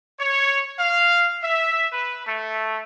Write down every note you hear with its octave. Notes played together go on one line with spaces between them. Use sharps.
C#5
F5
E5
B4
A3